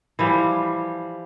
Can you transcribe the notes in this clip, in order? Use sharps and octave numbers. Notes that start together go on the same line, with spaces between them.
E3 F3 G3